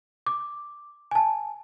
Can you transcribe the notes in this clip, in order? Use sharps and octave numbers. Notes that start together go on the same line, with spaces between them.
D6
G#5 A5